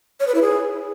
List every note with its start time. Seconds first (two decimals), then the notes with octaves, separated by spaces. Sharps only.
0.20 C#5
0.27 B4
0.35 E4
0.42 G#4